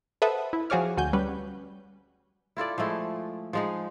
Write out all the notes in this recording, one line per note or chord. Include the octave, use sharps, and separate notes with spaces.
A4 B4 C5 E5 F#5 D#6
E4
F3 F#4 G#4 C#5 D6 F6
D2 F#4 G#5 G6
G3 C#4 B4
E4 F4 A4 D5
F3 G#3 A3 E4
F3 G#3 D#4